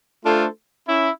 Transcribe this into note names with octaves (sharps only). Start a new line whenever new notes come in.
A3 D4 F4 A4 C5
C#4 E4